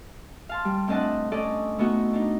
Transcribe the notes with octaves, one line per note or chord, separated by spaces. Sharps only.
F5 A5 C6
G3
A2 C4 D4 D#5 F#5 A5
C#4 A4 D5 D#5
A3 B3 D#4 F#4
D4 D#4